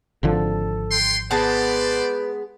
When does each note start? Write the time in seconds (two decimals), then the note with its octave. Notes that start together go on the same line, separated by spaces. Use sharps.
0.23 G#1 D3 F3 A4
0.90 C#5 G5 C6
1.31 G#3 B3 B4 C5 D5 A5